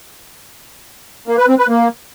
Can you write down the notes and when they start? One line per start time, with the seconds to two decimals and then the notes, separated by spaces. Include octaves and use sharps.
1.28 A#3
1.38 B4
1.48 C4
1.58 B4
1.69 A#3